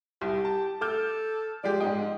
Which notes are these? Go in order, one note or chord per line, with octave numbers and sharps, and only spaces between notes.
C2 G4
A5
A4 D6 F6 G6
F3 G#3 G4 D5
G#2 G#3 D#5 G5